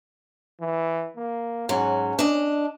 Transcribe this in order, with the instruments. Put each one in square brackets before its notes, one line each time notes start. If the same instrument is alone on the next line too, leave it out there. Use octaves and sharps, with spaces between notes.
[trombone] E3
A#3
[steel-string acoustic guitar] G#2 F#3 [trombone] C#4
[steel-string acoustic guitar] D4 D#5